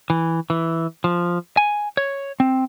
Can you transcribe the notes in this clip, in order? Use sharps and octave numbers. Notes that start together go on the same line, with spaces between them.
E3
E3
F3
G#5
C#5
C4